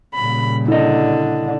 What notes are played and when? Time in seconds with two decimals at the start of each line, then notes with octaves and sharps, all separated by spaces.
0.14 A#2 C#3 G3 B5
0.68 D3 E4 D#5